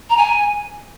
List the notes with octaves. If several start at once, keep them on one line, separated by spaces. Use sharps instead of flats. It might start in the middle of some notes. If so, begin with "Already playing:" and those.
A#5
G#5